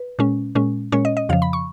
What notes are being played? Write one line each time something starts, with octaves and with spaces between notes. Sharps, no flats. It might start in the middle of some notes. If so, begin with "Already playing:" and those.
Already playing: B4
A#2 G#3 C#4
A#2 G#3 C#4
A#2 G#3 C#4 C#5
D#5
D#5
F2 C#3 F3 F5
B5
C#6